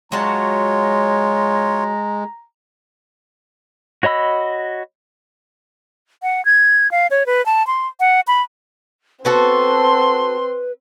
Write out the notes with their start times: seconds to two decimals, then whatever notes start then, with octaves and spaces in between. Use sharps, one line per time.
0.12 F#3 G#3 F4 F#4 C#5 A5 A#5
4.03 F#4 C#5 D#5 B5 E6
6.23 F#5
6.45 G#6
6.91 F5
7.11 C#5
7.26 B4
7.46 A5
7.67 C6
8.00 F#5
8.27 B5
9.25 B3 C4 F#4 A4 B4 C6